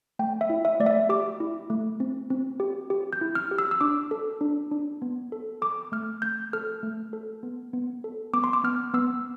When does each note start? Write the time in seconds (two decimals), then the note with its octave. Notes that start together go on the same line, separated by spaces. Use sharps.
0.19 A3 G5
0.41 E5
0.50 E4
0.65 E5
0.80 A3 D5
0.86 E5
1.09 G4 D6
1.40 E4
1.70 A3
2.00 C4
2.30 C4
2.60 G4
2.90 G4
3.13 G6
3.21 E4
3.35 F6
3.51 G4
3.58 E6
3.71 E6
3.81 D4 D6
4.11 A4
4.41 D4
4.71 D4
5.02 B3
5.32 A4
5.62 A4 D6
5.92 A3 F6
6.22 A3 G6
6.53 A4 F6
6.83 A3
7.13 A4
7.43 B3
7.73 B3
8.04 A4
8.33 B3 D6
8.44 C6
8.53 D6
8.64 B3 F6
8.94 B3 E6